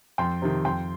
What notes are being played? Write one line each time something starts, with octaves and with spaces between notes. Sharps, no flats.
F2 G5 C6
C3 D#3
F2 G5 C6